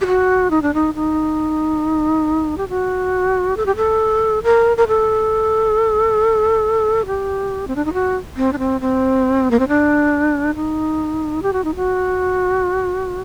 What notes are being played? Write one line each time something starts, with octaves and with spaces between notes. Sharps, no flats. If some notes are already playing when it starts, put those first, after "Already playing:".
G4
F#4
D#4
D4
D#4
D#4
G4
F#4
A4
G4
A4
A#4
A#4
A4
G4
C4
D4
D#4
F#4
C4
D4
C4
C4
A#3
C4
D4
D#4
G4
F#4
D#4
F#4